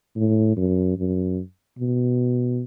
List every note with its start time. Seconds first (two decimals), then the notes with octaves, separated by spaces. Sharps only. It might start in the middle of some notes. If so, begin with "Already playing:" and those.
0.16 A2
0.57 F#2
0.98 F#2
1.79 B2